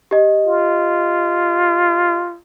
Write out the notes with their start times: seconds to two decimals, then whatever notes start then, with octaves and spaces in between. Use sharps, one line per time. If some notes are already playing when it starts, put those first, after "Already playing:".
0.11 G4 D#5
0.46 F4